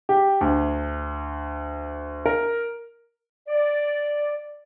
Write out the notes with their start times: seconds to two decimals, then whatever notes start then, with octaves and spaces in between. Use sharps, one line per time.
0.09 G4
0.41 D2
2.26 A#4
3.48 D5